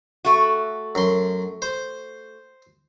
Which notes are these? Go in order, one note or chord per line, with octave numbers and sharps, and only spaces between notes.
A3 F#4
F#2 C6
C5